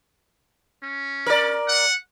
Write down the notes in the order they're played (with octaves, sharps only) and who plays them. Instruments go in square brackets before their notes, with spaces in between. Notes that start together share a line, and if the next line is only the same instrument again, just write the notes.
[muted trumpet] C#4
[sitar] A#4 D5
[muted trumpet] F#5